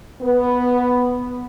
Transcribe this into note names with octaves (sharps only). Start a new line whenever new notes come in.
B3